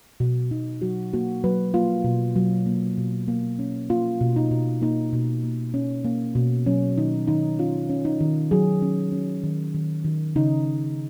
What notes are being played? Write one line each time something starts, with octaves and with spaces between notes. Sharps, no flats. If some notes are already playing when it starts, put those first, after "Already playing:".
B2
B2 D#4
F#3 F#4
A#3 F#4
F#3 B4
A#3 F4
B2
F#3
A#3
B2
A#3
C#4
A#3 F4
B2
D#4
B2
A#3 D#4
B2
A#3
C#4
A#3
B2
F#3 C#4
D#3 D#4
D#3 D#4
C#4 F4
C#4
D#4
D#3
F#3 G#4
C#4
C#4
D#3
D#3
D#3
C#3 D#4